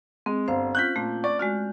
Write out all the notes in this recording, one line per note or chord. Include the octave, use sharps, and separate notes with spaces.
G#3 C4
G1 C5 F5
C#4 F4 F#6 G6 B6
A#2 A3
D5 C#6
G#3 F#4 D5 F6